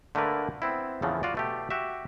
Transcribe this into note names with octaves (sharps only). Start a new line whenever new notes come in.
D3 A3 A#3 A#4 B4
B3 C4 E4
E2 A2 C#3 E3 F3
F4 F#4 D5
B2 A3 G4
F#4 G4 E5